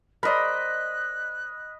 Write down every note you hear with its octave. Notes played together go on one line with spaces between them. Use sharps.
A#4 C5 D5 D#5 B5 F#6